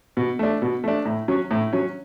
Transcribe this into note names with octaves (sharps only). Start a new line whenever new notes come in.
B2
A3 D4
B2
A3 D4
A2
F#3 C#4
A2
F#3 C#4